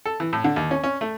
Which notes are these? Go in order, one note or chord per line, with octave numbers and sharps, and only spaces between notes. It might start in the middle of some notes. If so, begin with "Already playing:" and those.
A4
E3
A2
D3
D#2
C#4
C#4
A3